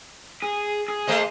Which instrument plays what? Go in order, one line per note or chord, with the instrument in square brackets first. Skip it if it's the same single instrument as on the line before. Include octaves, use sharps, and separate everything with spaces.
[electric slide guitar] G#4
G#4
[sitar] A3 C5 D#5